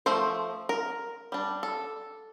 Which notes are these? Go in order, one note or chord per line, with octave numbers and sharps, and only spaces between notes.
F3 A3 C5
A#4
G3 D4
A4